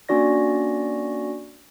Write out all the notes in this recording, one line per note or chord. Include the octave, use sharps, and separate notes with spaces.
A#3 C#4 D4 F#4 D5 A#6